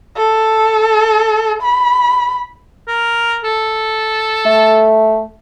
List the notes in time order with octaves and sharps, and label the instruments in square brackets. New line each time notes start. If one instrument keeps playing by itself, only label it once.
[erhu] A4
B5
[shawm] A#4
A4
[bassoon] A3